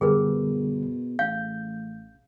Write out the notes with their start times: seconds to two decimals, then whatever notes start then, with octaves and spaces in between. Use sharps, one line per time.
0.01 F#2 B2 D3 G3 G#4 A#4 B4
1.19 A1 F5 G6